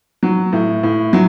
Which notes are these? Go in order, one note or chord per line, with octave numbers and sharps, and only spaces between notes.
F#3
A2
A2
F#3